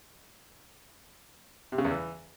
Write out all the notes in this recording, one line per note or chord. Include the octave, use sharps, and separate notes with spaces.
C3
C#3
E2
E3